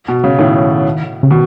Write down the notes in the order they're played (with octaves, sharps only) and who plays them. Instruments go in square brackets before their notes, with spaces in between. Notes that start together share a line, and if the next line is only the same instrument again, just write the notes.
[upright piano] B2
C#3
[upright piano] A2 [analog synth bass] D#3
[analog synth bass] C#3
[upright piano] B2 [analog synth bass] D#3